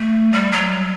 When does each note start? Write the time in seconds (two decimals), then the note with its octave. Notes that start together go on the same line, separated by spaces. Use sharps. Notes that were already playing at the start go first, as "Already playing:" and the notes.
Already playing: A3
0.32 G3
0.52 F#3